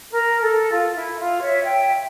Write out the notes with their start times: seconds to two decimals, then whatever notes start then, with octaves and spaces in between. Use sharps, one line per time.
0.11 A#4
0.41 A4
0.72 F4
0.96 E4
1.19 F4
1.42 C#5 E5
1.65 E5 G5